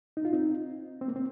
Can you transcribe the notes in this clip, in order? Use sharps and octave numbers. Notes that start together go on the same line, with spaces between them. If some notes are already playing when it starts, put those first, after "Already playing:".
D#4
F4
C4 D#4
C4
A#3
C4